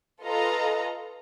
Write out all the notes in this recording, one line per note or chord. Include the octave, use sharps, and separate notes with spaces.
F4 A4 B4 D#5 F5 A#5